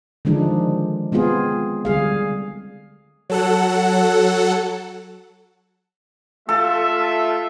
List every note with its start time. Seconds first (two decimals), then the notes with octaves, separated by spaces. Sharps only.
0.25 D3 D#3 F3 G#3 D4 D#4
1.12 G#3 B3 C4 F4 G#4
1.85 D3 G3 G#4 F5
3.30 F#3 A4 F#5
6.49 A3 F4 A4 E5